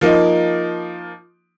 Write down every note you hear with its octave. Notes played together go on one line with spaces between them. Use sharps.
F3 A#3 D#4